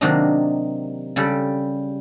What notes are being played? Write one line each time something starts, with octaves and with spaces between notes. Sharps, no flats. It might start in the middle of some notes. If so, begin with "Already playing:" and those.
C3 D#3 F#3 A#3 D4 D#5
C#3 G3 G4 A4